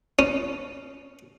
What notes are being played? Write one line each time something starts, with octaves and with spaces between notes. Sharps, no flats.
C#4